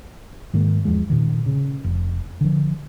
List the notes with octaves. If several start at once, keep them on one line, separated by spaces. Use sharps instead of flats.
G#2 D#3 G#3 A#3
E2 F3 G#3
A#2 D#3
C#3
F1
D3 F3